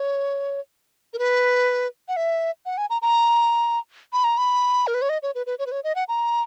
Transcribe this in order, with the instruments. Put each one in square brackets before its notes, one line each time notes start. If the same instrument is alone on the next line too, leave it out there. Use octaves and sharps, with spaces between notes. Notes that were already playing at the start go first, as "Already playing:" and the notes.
Already playing: [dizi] C#5
A#4
B4
F#5
E5
F#5
G#5
A#5
A#5
B5
A#5
B5
A#4
B4
C#5
D#5
C#5
B4
B4
C#5
B4
C#5
D#5
F#5
A#5